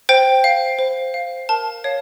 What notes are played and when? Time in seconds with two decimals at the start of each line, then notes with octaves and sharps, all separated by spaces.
0.09 C5 G5
0.44 F5
0.79 C5
1.14 F5
1.49 A#4 A5
1.84 C#5 F5